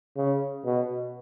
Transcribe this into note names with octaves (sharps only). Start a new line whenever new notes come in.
C#3
B2